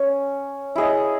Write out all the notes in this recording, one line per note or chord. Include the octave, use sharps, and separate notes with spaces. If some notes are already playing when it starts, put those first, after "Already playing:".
Already playing: C#4 C#5
E4 G#4 D#5